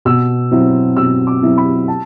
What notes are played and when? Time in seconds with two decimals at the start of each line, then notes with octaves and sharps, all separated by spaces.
0.05 B2 E6
0.51 F#3 C4 E4
0.96 B2 E6
1.27 D6
1.42 F#3 C4 E4
1.58 B5
1.88 A5